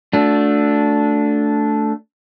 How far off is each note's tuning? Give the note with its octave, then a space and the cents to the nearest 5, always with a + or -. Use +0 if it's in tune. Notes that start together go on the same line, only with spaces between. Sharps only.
A3 +0 D4 -10 F#4 -35